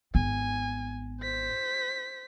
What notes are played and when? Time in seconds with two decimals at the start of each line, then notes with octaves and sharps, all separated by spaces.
0.15 G#1 B3 G#5
1.21 C5 B6